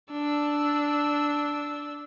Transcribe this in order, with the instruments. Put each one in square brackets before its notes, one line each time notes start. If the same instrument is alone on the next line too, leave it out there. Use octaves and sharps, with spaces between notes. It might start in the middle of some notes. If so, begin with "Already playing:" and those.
[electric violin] D4 E6